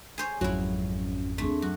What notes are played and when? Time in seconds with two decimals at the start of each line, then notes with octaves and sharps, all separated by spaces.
0.18 G#4 C5 C#5
0.41 G#1 F2 F#3 C#4 E4 F#4
1.38 D#2 A3 C4 D4 G#4
1.62 F#2 F#4